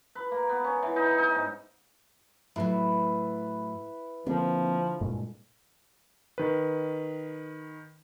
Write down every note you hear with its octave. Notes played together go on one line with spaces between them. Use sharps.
B4
A#3
B3
C#4
E3
D#4
D#4
G#2
A2 F#3 E4 B4
D3 F3 A#3 C4
G2 A#2 G#3
D#3 B4